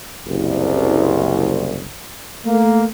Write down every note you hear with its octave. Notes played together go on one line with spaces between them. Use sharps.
F#1 C2
A3 A#3